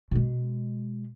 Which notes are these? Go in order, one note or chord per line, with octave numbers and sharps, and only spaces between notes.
B2 G#3